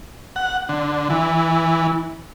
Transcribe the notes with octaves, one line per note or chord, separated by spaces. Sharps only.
F#5
D3
E3